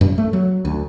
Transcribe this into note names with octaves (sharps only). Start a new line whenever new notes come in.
F#2
A3
F#3
D2